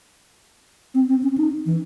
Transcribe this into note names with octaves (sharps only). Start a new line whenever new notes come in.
C4
C4
C#4
D#4
E3